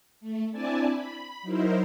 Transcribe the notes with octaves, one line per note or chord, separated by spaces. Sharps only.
A3
C4 D4 E4 D5 G#5 A5
B5
F#3 D#4 E4 A#4 C5